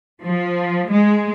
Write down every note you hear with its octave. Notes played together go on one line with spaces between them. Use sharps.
F3
G#3